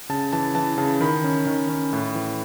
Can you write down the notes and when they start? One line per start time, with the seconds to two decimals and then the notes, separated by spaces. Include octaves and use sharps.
0.09 C#3 A5
0.33 E3 A5
0.55 E3 A5
0.78 C#3 A5
1.01 D#3 B5
1.24 C#4
1.47 D#3
1.69 C#4
1.93 A2
2.15 E3